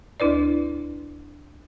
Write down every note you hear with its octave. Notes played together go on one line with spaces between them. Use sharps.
D2 D4 E4 B4 D5